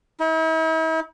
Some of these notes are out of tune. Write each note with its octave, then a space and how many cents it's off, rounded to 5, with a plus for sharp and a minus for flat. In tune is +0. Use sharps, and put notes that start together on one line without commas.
E4 -45